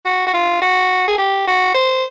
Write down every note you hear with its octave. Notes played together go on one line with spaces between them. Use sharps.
F#4
F#4
F4
F#4
G#4
G4
F#4
C5